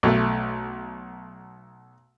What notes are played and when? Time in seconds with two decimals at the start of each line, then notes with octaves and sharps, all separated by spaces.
0.03 B1 A3